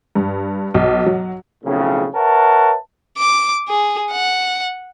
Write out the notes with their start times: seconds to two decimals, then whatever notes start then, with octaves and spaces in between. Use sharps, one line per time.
0.15 G2
0.74 B1
1.06 F#3
1.64 B1 F2 A2 C#3
2.14 A#4 B4 C#5 E5 F#5 A5
3.17 D6
3.68 G#4
4.11 F#5